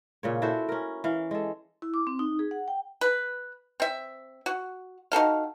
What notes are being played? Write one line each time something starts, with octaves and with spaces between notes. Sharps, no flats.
A#2 C#3 C#5
E4 F#4 A4 C5
C#4 A#4
E3 F5
G#3 A4
E4
D6
C4
D#4
G#4
F#5
G5
B4
C4 E5
F#4
D#4 F#4 A4 F5